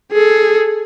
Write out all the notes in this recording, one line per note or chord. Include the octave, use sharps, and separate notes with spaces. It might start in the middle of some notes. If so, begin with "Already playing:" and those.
G#4 A4